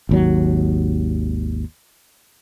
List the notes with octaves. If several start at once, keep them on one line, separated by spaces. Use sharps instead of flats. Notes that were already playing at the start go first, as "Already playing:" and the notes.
G#1 D#2 F#3